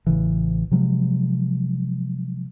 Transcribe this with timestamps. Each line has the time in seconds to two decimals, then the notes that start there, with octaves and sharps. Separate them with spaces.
0.07 A1 C#3 E3
0.71 C3 F3 F#3 G#3